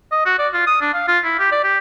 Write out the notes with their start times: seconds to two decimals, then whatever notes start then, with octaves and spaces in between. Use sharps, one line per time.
0.12 D#5
0.26 F#4
0.39 D5
0.53 F4
0.67 D#6
0.81 D4
0.94 F5
1.08 F4
1.24 E4
1.39 G4
1.52 D5
1.64 G4